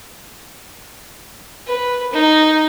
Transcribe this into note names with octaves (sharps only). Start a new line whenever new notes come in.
B4
D#4